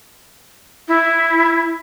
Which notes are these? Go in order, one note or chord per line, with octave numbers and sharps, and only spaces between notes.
E4